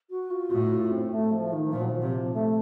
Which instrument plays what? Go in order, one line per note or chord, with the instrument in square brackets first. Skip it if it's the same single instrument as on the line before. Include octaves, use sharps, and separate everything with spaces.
[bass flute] F#4
F4
[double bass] A2 [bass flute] F#4
[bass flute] F4
C4
A3
F3
D#3
[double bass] A#2 [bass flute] F3
[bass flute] F#3
F3
[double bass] C3
[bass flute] A3